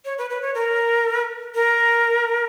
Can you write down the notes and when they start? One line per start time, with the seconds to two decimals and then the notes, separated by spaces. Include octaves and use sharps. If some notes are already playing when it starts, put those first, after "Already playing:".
0.05 C#5
0.18 B4
0.30 B4
0.42 C#5
0.55 A#4
1.55 A#4